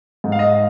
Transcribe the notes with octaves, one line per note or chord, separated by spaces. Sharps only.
G#2
F5
D#5